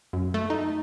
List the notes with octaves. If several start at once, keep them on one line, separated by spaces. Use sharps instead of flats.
F#2
A3
D#4